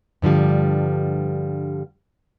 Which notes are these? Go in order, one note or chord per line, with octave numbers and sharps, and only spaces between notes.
G2 D3 F3 G3